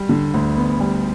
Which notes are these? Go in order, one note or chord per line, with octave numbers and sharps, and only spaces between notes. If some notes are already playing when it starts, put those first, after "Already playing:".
Already playing: G3
D3
D2
B3
G3